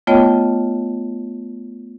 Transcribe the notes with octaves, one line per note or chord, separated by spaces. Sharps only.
A3 B3 F4 C#5 D#5 G5